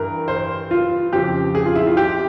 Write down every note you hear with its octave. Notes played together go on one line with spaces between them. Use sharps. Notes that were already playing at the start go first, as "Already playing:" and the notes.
Already playing: G2 E3 A#4
C5
F4
F2 C#3 F3 C4 G4
G#4
F4
E4
F4
G4